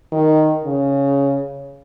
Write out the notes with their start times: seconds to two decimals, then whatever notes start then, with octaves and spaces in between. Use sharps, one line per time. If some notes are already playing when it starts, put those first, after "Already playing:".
0.12 D#3
0.65 C#3